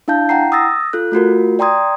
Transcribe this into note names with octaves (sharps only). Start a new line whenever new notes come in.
D4 E4 F5 A5 G6
E4 F#5 G5 A#5 C7
D#6 E6 A6 A#6
F4 A4 F#6
A3 F4 F#4 A#4
D5 G5 A#5 C6 D#6 G#6